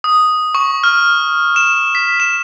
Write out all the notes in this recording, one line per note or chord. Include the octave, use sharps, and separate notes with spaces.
D#6
C#6
F6
E7
B6
E7